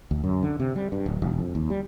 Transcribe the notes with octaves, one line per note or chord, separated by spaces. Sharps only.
D2
F#2
D3
C3
G3
G2
D1
E1
F2
D#2
G3